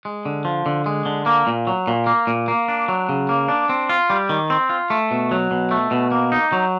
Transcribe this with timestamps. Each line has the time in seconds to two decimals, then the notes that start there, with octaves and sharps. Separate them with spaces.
0.05 G#3
0.26 D3
0.45 F3
0.66 D3
0.86 G#3
1.06 D3
1.26 A#3
1.47 A#2
1.67 F#3
1.87 A#2
2.07 A#3
2.27 A#2
2.48 A#3
2.68 D4
2.88 F#3
3.09 C#3
3.29 A#3
3.49 D4
3.69 C4
3.89 F4
4.10 G3
4.29 D#3
4.50 C4
4.70 F4
4.90 A3
5.11 B2
5.31 F#3
5.51 B2
5.71 A3
5.91 B2
6.12 A#3
6.32 D#4
6.52 F#3